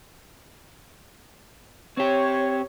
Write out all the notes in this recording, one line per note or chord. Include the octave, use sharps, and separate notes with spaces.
C4 G4 C#5